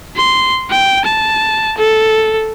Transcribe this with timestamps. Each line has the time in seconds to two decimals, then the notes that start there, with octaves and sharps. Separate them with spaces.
0.16 C6
0.70 G5
1.05 A5
1.78 A4